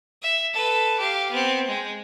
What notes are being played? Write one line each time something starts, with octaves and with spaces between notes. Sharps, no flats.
E5
A4 B4
G4 F5
B3 C4
G#3